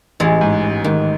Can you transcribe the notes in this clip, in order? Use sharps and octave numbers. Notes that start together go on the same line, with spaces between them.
A1 E3 G#3
G#2
A1
G#2 D#3